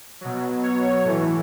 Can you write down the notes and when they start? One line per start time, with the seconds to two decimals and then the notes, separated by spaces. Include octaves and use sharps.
0.21 B2 F#3
0.63 C#5
1.04 A2 E3